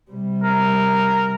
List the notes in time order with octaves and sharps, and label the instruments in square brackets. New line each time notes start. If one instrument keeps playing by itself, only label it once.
[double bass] C3 G3
[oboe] A#4